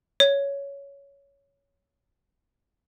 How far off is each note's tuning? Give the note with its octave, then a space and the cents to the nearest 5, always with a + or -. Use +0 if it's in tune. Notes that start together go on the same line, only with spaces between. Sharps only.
C#5 +10